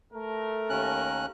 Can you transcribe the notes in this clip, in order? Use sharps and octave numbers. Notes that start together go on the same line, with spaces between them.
A3 A4 A#4
D#2 C#4 F#6